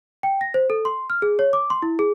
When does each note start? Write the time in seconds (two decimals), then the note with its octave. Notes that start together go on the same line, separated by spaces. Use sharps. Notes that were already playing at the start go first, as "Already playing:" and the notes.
0.23 G5
0.41 A#6
0.54 C5
0.70 A4
0.85 C6
1.10 F6
1.22 G#4
1.39 C#5
1.53 D6
1.70 C6
1.82 E4
1.99 G#4